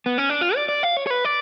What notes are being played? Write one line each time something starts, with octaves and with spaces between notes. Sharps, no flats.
B3
C#4
D4
F4
D5
D5
F5
C#5
C#5
B4
D5